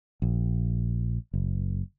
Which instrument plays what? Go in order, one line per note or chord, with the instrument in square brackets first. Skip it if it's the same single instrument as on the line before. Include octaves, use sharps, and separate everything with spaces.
[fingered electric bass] A#1
F#1